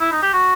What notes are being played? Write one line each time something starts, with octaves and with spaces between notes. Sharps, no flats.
E4
D#4
G4
F#4